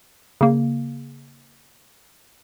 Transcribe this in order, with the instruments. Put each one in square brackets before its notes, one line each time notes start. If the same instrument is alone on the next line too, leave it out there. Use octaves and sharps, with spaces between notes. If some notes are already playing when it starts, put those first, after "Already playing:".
[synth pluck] C#3 A#3